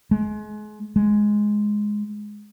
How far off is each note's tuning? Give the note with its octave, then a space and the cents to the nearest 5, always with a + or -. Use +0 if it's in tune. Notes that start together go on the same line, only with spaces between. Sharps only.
G#3 +30
G#3 +5